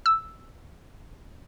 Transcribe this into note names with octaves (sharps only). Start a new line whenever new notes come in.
E6